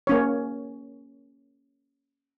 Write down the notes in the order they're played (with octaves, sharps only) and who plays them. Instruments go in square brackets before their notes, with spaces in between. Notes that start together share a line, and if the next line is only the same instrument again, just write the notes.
[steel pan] A#3 C#4 C#5